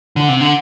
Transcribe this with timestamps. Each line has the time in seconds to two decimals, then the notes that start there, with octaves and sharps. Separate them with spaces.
0.16 D3
0.29 C3
0.41 D3